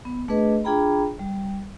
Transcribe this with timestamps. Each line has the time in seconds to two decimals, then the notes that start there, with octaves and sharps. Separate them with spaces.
0.05 B3
0.28 A3 D4 G#4 B4 D#5
0.64 D4 F4 G#4 G5 A#5 B5
1.19 G3